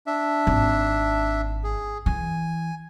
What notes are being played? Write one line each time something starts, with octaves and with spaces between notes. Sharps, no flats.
D4 E5
G#1
G#4
E3 G#5